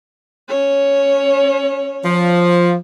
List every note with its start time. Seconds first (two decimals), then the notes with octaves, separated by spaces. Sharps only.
0.48 C#4 C#5
2.04 F3